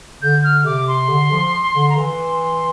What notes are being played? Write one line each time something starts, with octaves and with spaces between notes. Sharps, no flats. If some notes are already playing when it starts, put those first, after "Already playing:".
D3 G6
F6
C3 D6
C6
D3
F3
D3
A#5
E3 C6